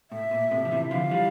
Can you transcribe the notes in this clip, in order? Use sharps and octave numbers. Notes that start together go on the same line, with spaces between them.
A2 E5
A#2
A2 C3
F3
C3 E3
D3 F3 F5
E3 G3